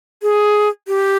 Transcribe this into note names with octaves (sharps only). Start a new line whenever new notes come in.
G#4
G4